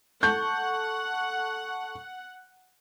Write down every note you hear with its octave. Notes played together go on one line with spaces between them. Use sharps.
A4 F#5 A5 C#6 G6